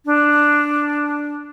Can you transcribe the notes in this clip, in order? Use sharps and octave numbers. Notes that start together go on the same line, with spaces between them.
D4